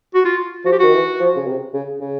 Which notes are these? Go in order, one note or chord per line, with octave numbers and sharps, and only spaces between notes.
F#4
F4
F3 F#4
G4
D#3 F#4
E3
F3
C#3
C3
C#3
C#3